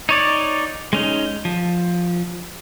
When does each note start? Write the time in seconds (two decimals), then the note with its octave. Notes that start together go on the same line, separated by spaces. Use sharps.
0.09 D#4 C#5 D5
0.93 G#3 C#4 D#4
1.45 F3